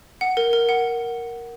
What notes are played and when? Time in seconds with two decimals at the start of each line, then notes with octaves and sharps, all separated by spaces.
0.21 F#5
0.37 A#4
0.53 A#4
0.69 F#5